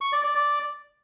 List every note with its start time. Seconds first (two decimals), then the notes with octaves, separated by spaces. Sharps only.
0.01 C#6
0.12 D5
0.24 D5
0.35 D5